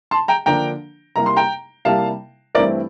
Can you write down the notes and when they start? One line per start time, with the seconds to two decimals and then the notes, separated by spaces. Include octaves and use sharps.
0.11 A5 C6
0.28 G5 A#5
0.46 D3 F3 A#3 D4 G5 A#5
1.16 C3 G3 A#3 E4 A#5
1.26 C6
1.36 G5 A#5
1.85 C3 G3 A#3 E4 F5 A5
2.55 G2 E3 A3 C4 E4 A#4 D5